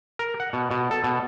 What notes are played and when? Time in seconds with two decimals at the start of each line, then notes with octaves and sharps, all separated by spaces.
0.19 A#4
0.40 F#5
0.53 B2
0.71 B2
0.91 A4
1.04 B2